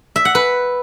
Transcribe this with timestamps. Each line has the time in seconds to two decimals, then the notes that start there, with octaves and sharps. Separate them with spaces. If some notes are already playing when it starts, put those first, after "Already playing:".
0.16 E5
0.25 F#5
0.35 B4